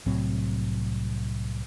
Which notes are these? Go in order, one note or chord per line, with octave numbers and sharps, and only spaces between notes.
C2 A2 F#3 C4